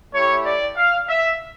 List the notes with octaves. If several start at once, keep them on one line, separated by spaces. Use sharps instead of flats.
A3 E4 G4 C#5
D5
F5
E5